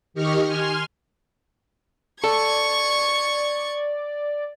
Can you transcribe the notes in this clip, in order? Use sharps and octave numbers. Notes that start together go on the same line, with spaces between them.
D#3 G4 D#5 C#6 F6
G#5 C6 F6 C7
A4 D5 C#6 G#6